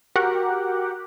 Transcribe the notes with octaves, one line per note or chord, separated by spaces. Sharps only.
F#4 G4 A#4 F#5